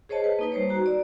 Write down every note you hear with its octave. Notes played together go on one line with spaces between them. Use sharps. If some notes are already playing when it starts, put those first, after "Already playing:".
G#4 C5 C#5 D#5 A5
B4
A#3 D#4 B4
G3 C5 C#5
F#4 A#5
D5